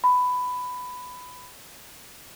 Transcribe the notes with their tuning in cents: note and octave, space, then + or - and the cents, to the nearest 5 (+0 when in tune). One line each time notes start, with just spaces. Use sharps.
B5 +10